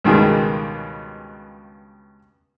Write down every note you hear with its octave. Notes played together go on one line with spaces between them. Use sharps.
C#2 G2 B2 D#3 G#3 G#4